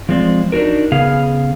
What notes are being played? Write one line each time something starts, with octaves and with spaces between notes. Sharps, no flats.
F3 G#3 C4 D5
D4 D#4 F#4 A#4
C#3 B3 G#4 F5